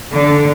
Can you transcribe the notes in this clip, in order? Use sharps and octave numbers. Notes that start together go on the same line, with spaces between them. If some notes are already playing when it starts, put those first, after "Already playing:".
D3